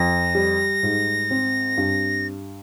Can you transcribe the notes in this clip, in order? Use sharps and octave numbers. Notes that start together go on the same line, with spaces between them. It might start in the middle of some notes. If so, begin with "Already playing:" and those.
Already playing: F2 A#6
G3
G#2
C4
G2